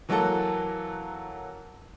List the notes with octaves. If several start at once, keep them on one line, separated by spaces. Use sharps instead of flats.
E3 F#3 A#3 F#4 A4